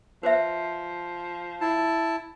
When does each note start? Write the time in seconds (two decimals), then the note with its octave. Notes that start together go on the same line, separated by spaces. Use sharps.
0.23 F3 B4 C5 E5
1.61 E4 A5